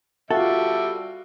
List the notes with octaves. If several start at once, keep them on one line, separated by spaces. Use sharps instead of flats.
G3 F4 F#4 A4 E5